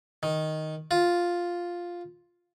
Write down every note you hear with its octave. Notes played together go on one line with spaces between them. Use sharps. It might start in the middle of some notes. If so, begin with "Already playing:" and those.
D#3
F4